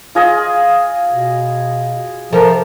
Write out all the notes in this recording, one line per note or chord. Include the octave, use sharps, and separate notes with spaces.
F4 G#4 D#5
B2
C3 F3 A4 A#4